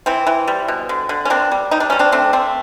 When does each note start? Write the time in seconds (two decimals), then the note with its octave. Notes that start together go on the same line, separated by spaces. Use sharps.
0.06 E3 C4
0.27 E3
0.48 G3
0.68 B2
0.89 D3
1.09 D3
1.25 C#4
1.30 A#3 C4 D4
1.51 G3
1.71 G3 D#4
1.80 D4
1.90 G3 C#4
1.99 C4 D4
2.12 A3 C4 D4
2.33 A3 C4